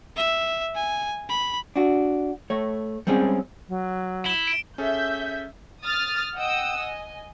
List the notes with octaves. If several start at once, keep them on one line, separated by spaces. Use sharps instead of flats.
E5
G#5
B5
D4 F#4
A3 C#5
G3 G#3 C4 C#4 G#4
F#3
E4 E7 G7
D7
C#4 G#4 A4 E5 G6
D#6 F6 A6
D#5 F#5 G5 D#6 E6
D#5 G#5